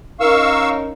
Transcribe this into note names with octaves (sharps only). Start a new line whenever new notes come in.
C#4 D#4 A#4 F5 C#6 E6